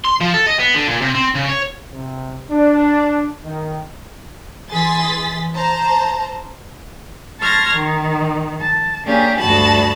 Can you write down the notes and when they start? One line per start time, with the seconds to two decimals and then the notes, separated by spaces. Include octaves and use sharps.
0.05 C6
0.21 F3
0.34 A4
0.47 D#5
0.59 B3
0.74 D3
0.87 A#2
1.01 C3
1.15 C4
1.35 C#3
1.49 C#5
1.93 C3
2.51 D4
3.44 D#3
4.70 E3 G#4 C6 A6 B6
5.52 C5 A5 A#5
7.40 A5 C6 C#6 F6 G#6 A#6
7.74 D#3
8.60 A5
9.05 A#3 C#4 D4 G4 G#4
9.38 D2 G2 F#4 A5 B5